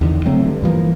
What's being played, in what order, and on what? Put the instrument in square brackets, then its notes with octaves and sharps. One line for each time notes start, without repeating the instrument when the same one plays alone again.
[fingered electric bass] E2 D3 D#3
C#3 F#3 A3 C4
G2 D3
G2 E3 F3 A#3